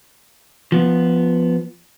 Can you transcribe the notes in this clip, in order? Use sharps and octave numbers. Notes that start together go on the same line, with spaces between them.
F3 B3